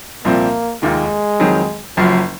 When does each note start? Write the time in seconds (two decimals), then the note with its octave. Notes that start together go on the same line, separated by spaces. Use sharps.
0.25 C2 A#2 F3 A#3 C4
0.82 F1 D#2 D#3 G#3 A#3 F4
1.40 F2 D#3 F#3 C4
1.97 F#1 F#2 F3 F#3